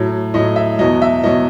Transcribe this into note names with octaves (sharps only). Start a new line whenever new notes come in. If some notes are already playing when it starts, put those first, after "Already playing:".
Already playing: A2 F#3
A2 F#3 D#5
E5
E2 B2 F#3 D#5
E5
E2 B2 F#3 D#5